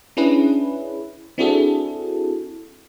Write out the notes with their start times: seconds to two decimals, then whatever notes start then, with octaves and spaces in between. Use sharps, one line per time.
0.17 C#4 D4 E4 G#4 B4
1.38 C4 D4 E4 F#4 G#4 A4